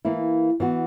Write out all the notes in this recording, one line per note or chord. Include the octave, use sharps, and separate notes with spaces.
E3 A#3 E4
E3 B3 F#4